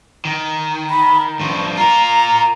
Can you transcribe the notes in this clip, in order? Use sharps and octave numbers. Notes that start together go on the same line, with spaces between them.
D#3
B5
G2 F3 C#6
F4 A#4 A#5